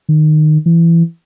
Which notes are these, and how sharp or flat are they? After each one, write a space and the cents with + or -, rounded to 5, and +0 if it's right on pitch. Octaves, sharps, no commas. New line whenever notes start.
D#3 -20
E3 +20